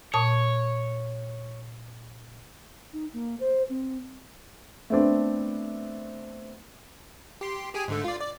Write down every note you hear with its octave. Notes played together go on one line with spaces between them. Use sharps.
A#2 C#5 A5 D#6
D#4
A#3
C5
C4
A3 B3 C4 D4
G4 C6
G4 G#4 G#5
G#2 D3 A3
F4 D5
D5